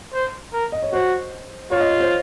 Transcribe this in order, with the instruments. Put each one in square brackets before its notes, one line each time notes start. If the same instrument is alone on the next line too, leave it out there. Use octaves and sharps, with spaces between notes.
[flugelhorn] C5
A#4
[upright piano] D#5
C#5
[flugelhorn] F#4 [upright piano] C5
[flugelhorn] F4 [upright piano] C#5
[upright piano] D#5
C#5
C5